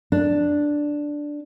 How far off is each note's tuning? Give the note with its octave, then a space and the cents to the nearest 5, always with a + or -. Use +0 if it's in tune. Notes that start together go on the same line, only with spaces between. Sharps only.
D4 +0